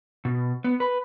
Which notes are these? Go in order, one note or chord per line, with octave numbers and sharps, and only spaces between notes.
B2
B3
B4